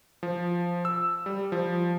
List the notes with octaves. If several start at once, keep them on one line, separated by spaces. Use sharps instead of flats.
F3
E6
G3
F3